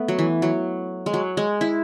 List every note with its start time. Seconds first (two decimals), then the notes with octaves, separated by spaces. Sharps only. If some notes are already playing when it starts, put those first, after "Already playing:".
Already playing: A3 B3
0.08 F#3
0.19 E3
0.42 F#3
1.06 G#3
1.14 F#3
1.37 G#3
1.61 E4